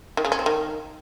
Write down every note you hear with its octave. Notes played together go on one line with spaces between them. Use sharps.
D#3
C#3
C#4
C4
D#3